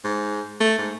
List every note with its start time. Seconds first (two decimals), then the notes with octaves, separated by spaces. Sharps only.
0.04 G#2
0.60 A3
0.78 G#2